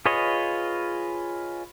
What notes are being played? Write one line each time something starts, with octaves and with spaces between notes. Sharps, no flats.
F4 G#4 B4 C#5 D#5